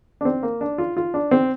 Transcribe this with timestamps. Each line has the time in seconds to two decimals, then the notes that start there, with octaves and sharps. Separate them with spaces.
0.21 D4
0.25 C4
0.43 A#3
0.61 D4
0.78 F4
0.97 F4
1.14 D4
1.31 C4